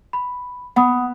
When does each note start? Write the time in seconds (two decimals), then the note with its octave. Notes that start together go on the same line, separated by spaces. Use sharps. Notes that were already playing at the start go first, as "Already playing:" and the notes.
0.13 B5
0.76 B3 F#5 B5 D#6